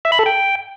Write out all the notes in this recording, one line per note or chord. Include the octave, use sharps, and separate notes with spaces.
E5
B5
A4
G5